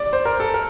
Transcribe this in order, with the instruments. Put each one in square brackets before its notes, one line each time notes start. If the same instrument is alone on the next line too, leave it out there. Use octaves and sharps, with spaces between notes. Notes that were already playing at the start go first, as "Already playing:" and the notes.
Already playing: [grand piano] D5
C5
A#4
A4
A#4